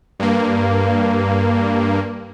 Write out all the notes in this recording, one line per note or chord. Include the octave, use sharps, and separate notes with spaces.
G2 A#3